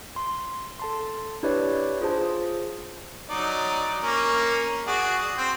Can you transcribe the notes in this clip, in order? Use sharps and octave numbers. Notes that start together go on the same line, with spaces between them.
C6
A4 A5 C6
D4 E4 G4 B4 C#5 D5
F4 G#4 C5 A5
F#3 D#4 D5
A#3 C#4 A#4
F#4 G#4 D5
C4 G5